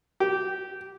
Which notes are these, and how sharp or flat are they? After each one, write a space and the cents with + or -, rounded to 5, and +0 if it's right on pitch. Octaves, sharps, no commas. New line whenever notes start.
G4 -15